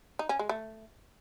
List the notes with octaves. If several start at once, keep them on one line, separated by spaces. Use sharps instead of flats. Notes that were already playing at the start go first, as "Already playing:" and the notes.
D#4
C#4
G#3
A3